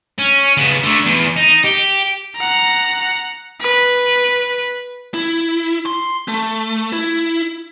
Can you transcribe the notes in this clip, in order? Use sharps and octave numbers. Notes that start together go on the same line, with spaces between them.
C#4
C#3 B3
D3 A3
E2
D#4
G4
F#5 A#5
B4
E4
C6
A3
E4